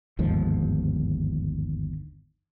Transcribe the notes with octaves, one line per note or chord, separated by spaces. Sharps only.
G1 D#2 G#2 F3